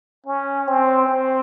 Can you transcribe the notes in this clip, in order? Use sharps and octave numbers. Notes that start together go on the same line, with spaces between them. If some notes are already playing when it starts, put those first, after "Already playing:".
C#4
C4
C4